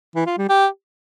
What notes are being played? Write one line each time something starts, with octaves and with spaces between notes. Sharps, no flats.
E3
F4
G3
G4